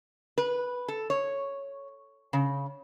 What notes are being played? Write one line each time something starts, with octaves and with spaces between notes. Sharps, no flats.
B4
A4
C#5
C#3